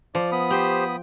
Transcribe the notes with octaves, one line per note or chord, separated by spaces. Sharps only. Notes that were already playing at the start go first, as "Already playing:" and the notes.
F3 D5
B3 B5 D#6
G4 C5 G5